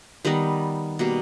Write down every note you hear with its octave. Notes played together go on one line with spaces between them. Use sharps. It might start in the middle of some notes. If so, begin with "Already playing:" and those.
D#3 G3 B3 D#4
B2 G3 A#3